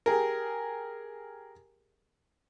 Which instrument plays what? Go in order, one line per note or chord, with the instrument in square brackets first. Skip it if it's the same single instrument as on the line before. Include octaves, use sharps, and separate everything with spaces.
[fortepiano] G4 G#4 A#4